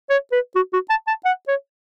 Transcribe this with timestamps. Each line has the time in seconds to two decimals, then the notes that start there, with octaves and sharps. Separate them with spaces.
0.10 C#5
0.32 B4
0.56 F#4
0.73 F#4
0.90 A5
1.08 A5
1.25 F#5
1.48 C#5